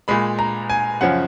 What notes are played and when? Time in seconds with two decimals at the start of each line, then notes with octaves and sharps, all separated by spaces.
0.08 A#2 G#3 B5
0.39 A#5
0.70 G#5
1.01 F#2 C#3 F3 F#5